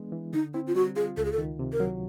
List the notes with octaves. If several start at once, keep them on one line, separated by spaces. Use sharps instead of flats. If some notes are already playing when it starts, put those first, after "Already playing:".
Already playing: E3 G#3 B3 D4
E3
D3 D#4
C4 E4
F4
G3 F#4
F4 G#4
C#2 A4
G#4
A4
D#3
C3
A#4
F#3